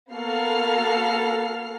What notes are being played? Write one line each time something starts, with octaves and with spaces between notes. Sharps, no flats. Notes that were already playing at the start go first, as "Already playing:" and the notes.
A#3 B3 F#4 A4 F6 C7